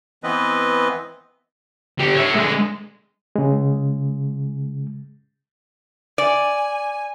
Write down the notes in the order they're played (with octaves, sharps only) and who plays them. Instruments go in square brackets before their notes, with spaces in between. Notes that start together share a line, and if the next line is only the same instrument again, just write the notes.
[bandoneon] E3 B3 C4 B4 D#5
[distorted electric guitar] D3 G4
C#5 E5
D3 G#3
[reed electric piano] C#3 G#3
[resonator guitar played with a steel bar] D5 [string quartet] G#5